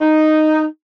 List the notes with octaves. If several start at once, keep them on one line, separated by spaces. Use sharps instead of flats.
D#4